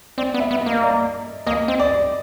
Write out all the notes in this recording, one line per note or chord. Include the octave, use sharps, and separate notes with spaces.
C4 D5
B3
E5
B3
D#5
A#3
D5
A#3 D#5
C4
D5